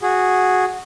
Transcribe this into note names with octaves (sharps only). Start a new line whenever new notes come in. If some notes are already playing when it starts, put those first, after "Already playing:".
F#4 G#4